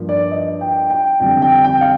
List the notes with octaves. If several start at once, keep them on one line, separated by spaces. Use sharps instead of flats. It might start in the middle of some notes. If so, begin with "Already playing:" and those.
Already playing: G2 F3 A#3
D5
D#5
G5
G5
F2 D3 G3 D4 G5
G5
G5
F5